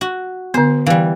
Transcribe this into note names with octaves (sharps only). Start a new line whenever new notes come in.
F#4
D3 B3 C5
E3 G3 F5